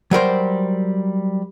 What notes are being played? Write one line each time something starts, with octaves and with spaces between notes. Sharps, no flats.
F#3 G3 A#4 C5